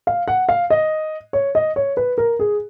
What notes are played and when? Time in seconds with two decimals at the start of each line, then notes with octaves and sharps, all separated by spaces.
0.07 F5
0.28 F#5
0.49 F5
0.70 D#5
1.33 C#5
1.55 D#5
1.76 C#5
1.97 B4
2.18 A#4
2.39 G#4